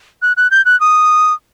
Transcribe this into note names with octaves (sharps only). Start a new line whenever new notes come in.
F#6
F#6
G6
F#6
D#6